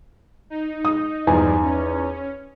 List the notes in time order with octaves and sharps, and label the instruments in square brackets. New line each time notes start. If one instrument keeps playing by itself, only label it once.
[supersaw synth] D#4
[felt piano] D#6
[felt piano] E2 D#4 G#5 [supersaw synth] G2 F3 G3
[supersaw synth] C#4